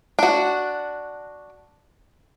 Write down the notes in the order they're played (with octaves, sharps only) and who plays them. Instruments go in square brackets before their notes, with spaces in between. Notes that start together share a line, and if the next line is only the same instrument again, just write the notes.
[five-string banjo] D4 F#4